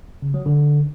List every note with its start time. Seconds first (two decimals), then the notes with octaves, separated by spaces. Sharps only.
0.22 C#3
0.34 F#3
0.46 D3